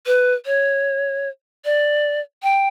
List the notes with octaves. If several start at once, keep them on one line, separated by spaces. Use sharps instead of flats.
B4
C#5
D5
G5